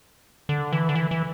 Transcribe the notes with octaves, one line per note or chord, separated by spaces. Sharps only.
D3
E3
D3
E3
E3